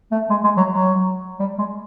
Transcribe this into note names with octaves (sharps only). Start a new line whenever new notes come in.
A3
G#3
G#3
F#3
F#3
G3
G#3